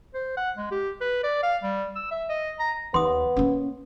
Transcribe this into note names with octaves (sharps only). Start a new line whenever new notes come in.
C5
F#5
G#3
G4
B4
D5
F5
G3
E6
E5
D#5
A#5
D#2 B3 C6 D#6
A#3 C#4